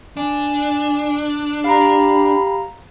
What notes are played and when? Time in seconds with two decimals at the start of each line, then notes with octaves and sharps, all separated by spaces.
0.17 D4 G#5
1.64 G4 F5 A#5 B5